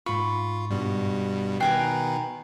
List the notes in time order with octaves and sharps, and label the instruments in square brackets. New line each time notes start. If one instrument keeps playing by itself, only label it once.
[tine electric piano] G#2 C#6 [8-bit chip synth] F4 [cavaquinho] B5
[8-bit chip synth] G2 B2 G3
[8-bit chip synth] B2 D#3 B4 [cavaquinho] G5 G#5 A#5 [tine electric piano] F#6 C7